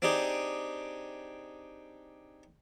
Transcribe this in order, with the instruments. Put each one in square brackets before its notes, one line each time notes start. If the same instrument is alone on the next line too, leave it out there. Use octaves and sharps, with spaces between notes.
[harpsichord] C4 D4 D#4 G4 G#4